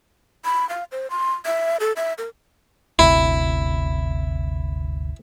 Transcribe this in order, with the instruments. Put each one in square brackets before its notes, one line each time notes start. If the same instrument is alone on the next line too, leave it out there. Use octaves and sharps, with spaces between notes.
[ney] B5
F5
C5
C6
E5
A4
E5
A#4
[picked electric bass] G1 D2 C3 [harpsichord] E4